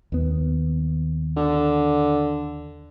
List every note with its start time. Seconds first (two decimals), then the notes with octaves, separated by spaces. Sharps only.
0.12 D#2 D#3 B3
1.37 D3